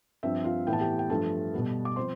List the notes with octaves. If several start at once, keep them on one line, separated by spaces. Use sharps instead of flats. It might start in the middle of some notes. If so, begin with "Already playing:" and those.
G2 F3 C4 E5
F4 F5
A2 E3 B3 G5
A5
G4 G5
G5
G2 F3 A3 A4 A5
B2 G3 B3
D6
F3 C4 C5 C6